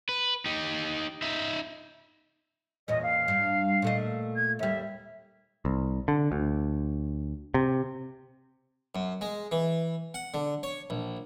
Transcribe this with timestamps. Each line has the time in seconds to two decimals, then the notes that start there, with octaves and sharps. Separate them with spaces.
0.09 B4
0.45 D#4 G4
1.22 D#4 E5
2.88 E2 A#2 C#4 D#5
3.02 F5
3.28 G2
3.82 A#2 A3 D#5
4.35 G#6
4.59 D#2 G3 E5
5.65 C2
6.08 D3
6.32 D2
7.54 C3
8.95 F#2
9.21 G#3
9.52 E3
10.14 F#5
10.34 D3
10.63 C#5
10.90 A#1